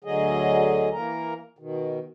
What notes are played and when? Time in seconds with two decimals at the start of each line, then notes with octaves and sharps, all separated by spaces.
0.04 D2 D3 F#3 G#4 D#5
0.93 E3 A#3 A#4 A#5
1.59 B2 D#3